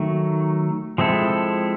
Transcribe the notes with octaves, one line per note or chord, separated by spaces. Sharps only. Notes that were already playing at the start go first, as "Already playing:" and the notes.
Already playing: D#3 F#3 A3
F3 G#3 C4 E4 A4